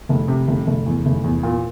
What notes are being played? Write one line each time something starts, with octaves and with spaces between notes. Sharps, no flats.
F1
C3
F1
F1
E2
F1
E2
A#2